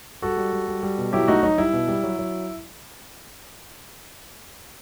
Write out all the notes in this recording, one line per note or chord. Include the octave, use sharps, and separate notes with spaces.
G3 F#4 A4
G3
G3
G3
G3
B2
F#3 E4 G4
A3 D#4 F#4
F#3 D#4
G3 E4
B2
G3
F#3
F#3